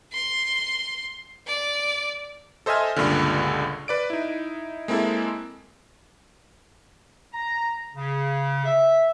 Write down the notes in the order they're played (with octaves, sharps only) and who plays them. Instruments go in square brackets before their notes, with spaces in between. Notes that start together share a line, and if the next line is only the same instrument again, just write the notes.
[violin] C6
D5
[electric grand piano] A4 C5 D#5 E5 G#5 F6
C#2 G2 A#2 D3
B4 D5 D7
D#4 E4
G#3 A#3 C4 E4 A4
[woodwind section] A#5
C#3
E5